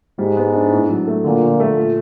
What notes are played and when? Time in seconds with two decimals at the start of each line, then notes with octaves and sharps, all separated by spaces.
0.19 G#2 G3
0.37 B3
0.54 D4
0.71 A2
0.89 F#3
1.07 A3
1.24 A#2 D3
1.42 F3
1.60 A3
1.77 A#2